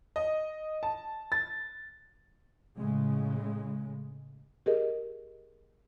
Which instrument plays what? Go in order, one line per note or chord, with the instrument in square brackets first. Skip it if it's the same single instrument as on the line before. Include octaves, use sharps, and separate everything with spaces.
[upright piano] D#5
A5
A6
[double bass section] A2 C#3 G#3
[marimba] G4 G#4 A#4 D#5